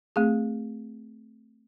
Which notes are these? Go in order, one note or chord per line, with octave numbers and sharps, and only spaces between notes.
A3 C4 G#4